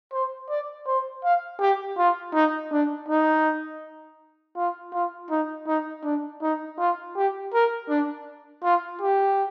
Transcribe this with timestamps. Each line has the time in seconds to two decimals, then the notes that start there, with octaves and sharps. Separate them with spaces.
0.13 C5
0.50 D5
0.87 C5
1.24 F5
1.60 G4
1.98 F4
2.34 D#4
2.72 D4
3.08 D#4
4.57 F4
4.94 F4
5.30 D#4
5.67 D#4
6.04 D4
6.42 D#4
6.79 F4
7.16 G4
7.54 A#4
7.89 D4
8.64 F4
9.02 G4